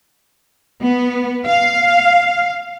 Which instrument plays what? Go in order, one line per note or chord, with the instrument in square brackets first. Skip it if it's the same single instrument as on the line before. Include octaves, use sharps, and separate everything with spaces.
[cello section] B3
F5